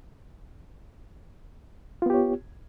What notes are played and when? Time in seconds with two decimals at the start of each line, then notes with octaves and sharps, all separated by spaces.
2.02 F4
2.06 B3
2.10 G4
2.14 C#5